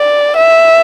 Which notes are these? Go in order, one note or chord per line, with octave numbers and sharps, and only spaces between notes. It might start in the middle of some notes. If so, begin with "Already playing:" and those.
Already playing: D5
E5